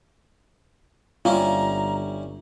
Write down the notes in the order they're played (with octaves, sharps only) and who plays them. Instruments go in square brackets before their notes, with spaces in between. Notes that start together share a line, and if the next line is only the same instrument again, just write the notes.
[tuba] G1 [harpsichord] G3 C#4 E4 [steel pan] F4 [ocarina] A#5